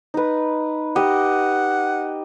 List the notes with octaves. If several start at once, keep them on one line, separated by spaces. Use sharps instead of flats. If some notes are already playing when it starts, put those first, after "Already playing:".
D#4 B4
G4 D#5 F#5